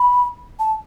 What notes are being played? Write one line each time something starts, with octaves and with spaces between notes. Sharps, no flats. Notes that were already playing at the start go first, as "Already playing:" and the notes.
Already playing: B5
A5